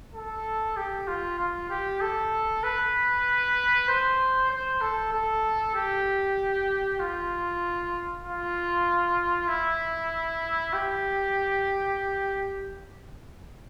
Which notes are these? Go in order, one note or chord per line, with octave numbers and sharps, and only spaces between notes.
A4
G4
F4
F4
G4
A4
B4
C5
C5
A4
A4
G4
F4
F4
E4
G4